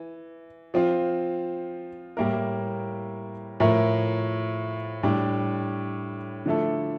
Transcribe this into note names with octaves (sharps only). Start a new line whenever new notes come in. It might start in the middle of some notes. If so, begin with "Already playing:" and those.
Already playing: E3
F3 C4 F4
A2 G3 A#3 E4 A#4
A2 F3 A3 E4 A#4
A2 G3 D4
D3 F3 A3 E4 A4